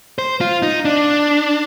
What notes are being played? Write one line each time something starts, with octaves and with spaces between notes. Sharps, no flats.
C5
F4
D#4
D4